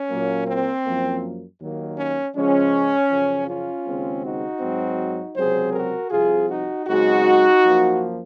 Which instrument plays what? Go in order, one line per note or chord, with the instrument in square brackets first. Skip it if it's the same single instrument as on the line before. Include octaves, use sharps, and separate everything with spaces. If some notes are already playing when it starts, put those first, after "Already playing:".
Already playing: [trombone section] C#4
A#2 F#3 A#3
C4
F#2 F3 A#3
D#2 D#3 F#3 A#3
C#4
C#2 C#3 F3 G#3 C#4
F#2 C#3 F3
C#4 F4
D#2 C#3 G#3 C4
D#4 F#4
G#2 F#3 C4
C#2 C3 F#3 C4 G#4 C5
F#4 A#4
C2 C3 F3 F4 G#4
D#4 F#4
F#2 C#3 G#3 C4 D#4 F#4
F#2 F3 A#3